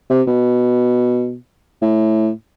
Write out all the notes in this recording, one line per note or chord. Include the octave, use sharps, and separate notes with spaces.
C3
B2
A2